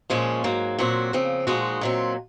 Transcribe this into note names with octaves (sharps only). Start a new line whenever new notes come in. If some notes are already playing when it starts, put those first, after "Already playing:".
A#2 F3 G#3 C#4
G#2 F#3 A#3
A#2 F#3 C4 F#4
C#3 F3 C4
A#2 F3 G#3 D#4 F#4
A#2 F#3 C4